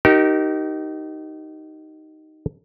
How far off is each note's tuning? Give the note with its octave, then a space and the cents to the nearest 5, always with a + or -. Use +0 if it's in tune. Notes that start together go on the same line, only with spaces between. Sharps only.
D#4 +0 G4 -35 A#4 -5